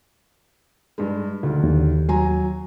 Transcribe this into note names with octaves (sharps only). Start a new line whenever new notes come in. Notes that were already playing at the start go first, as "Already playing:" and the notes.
G2 G#3
D2 D#3
D#2
F#3 G#5 A#5